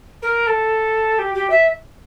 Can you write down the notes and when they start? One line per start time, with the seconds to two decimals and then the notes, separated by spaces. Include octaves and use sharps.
0.22 A#4
0.46 A4
1.18 G4
1.34 G4
1.50 E5